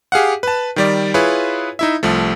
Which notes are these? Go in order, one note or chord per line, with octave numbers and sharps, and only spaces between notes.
G4 G#4 F5 F#5
B4 A5
D#3 G3 D5
E4 F4 G#4 B4 C#5
D#4 E4 E5
C2 F3 A3